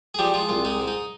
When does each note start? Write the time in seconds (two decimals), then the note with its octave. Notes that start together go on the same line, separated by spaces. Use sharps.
0.14 G#4
0.18 F3 G3 G4
0.34 G#3 F4
0.49 C2 F4
0.65 G#3 D#4
0.80 G#2
0.88 D#4